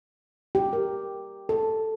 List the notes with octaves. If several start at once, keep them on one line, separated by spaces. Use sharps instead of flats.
G4
A#4
A4